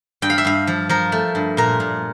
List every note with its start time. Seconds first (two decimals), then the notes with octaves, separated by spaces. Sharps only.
0.22 G2 G5
0.30 F5
0.38 E5
0.45 G2 F5
0.67 F3
0.89 F3 A#4
1.12 A3
1.35 G2
1.57 A#2 A#4
1.80 A#2